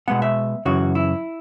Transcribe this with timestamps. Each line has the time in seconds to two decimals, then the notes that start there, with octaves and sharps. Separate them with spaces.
0.08 B2 G#3 B3 F#5
0.22 E5
0.65 F#2 C#3 E3 F#4
0.95 E4